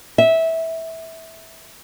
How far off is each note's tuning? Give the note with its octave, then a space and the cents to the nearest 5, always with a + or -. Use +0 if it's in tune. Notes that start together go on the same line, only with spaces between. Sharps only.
E5 -15